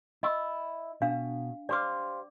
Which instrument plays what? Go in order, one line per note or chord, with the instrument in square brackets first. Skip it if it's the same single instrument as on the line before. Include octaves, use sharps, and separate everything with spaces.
[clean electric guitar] E4 [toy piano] D#5
[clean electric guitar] B2 [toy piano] D4 F5
[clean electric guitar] G4 C5 F5 [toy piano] D5 D6